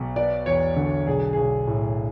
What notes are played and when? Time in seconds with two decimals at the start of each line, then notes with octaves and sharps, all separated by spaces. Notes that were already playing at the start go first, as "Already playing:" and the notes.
Already playing: B1 B2
0.16 B3 D5
0.46 E2 C#5
0.76 D3
1.07 B1 G#4
1.33 B1 G#4
1.67 A2